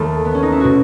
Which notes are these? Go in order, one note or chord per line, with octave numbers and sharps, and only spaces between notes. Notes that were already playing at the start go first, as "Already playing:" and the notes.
Already playing: D#2 D#3 A3
B3
C#4
D#4
E4
B2 F#4